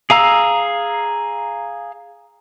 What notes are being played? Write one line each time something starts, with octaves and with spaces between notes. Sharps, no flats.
G#4 F5 A#5 E6